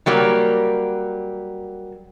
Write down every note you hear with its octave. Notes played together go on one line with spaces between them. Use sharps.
F#3 G3 A#3